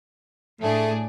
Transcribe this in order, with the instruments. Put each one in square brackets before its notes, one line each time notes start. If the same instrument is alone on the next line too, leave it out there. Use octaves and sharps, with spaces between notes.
[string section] A2 D4 G#4 [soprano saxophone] A3